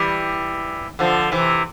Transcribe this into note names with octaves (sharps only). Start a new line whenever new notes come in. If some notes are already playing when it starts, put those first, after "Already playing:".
Already playing: E3 G3
D3 F3
C3 E3